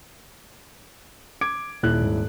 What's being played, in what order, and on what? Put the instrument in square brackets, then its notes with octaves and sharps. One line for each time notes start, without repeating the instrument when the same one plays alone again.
[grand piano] D6 G#6 D7
[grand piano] D#1 E4 F#6 [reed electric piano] A#2
[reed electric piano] G#2